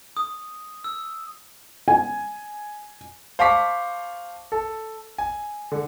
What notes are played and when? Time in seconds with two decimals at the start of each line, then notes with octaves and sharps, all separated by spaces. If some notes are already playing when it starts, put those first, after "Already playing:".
0.17 D#6
0.84 E6
1.88 G#5
3.39 C5 F5 A5 C#6 D6 B6
4.52 A4
5.18 G#5
5.72 D3